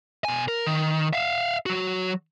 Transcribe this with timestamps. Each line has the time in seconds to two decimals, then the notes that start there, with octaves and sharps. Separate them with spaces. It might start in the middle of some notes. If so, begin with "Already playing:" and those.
0.25 B2 G#5
0.48 A#4
0.67 D#3
1.13 E5 F5
1.66 F#3 F#4